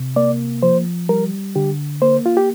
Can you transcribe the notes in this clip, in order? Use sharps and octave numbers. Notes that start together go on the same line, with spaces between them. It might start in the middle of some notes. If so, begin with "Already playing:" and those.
Already playing: C3
A#3 D5
F3 C5
G3 A#4
D3 G4
A#3 C5
F4
G4